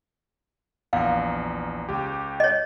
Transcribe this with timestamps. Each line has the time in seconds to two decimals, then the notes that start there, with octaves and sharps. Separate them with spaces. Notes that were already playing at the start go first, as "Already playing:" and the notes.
0.93 A#1 E2 F5
1.89 C#2 G4
2.40 C#5 D#5